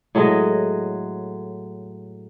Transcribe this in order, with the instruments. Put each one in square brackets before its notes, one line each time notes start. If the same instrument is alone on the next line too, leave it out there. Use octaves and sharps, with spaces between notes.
[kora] A2 F#3 G#3 D#5